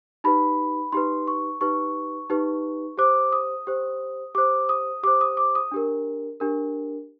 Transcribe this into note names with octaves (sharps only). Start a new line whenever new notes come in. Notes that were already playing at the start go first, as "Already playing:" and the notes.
D#4 G4 B4 B5
D#4 G4 B4 C6
C#6
D#4 G4 B4 C#6
D#4 G4 B4
G4 C5 D6
D#6
G4 C5
G4 C5 D6
D#6
G4 C5 D6
D#6
D6
D#6
D4 G4 A#4
D4 G4 A#4